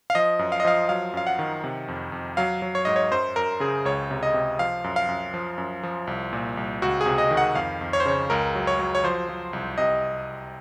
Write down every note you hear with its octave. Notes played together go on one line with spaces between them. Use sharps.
F5
F3 D#5
F#2
F5
D#5
F3 F5
F#3 F5
F#2 F5
F#5
D#3
C3
F2
F2
F#3 F5
F#3
C#5
G#2 D#5
C#5
F#2 C5
F#2 A#4
C#3 G#4
C#2 C#5
C3
D#5
C3
F3 F5
F#2
F5
F#2
F3
F#2
F3
C2
A#2
C2
C#2 F#4
G#4
C3
D#5
D#3
F#5
F2 F5
F2
C#5
C5
C#3 C#5
C#2 A#4
F#3
C#5
F#3
C#5
F3 C5
F3
C2
C3 D#5